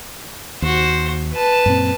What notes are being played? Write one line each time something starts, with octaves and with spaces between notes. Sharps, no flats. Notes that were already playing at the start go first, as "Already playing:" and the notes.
D#2 F#4 C5
B4 A5
F#2 A#2 C4